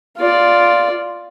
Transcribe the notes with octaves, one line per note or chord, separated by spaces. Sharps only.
F4 D5